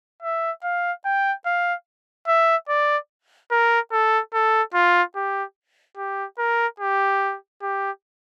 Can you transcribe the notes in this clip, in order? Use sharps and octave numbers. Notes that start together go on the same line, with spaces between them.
E5
F5
G5
F5
E5
D5
A#4
A4
A4
F4
G4
G4
A#4
G4
G4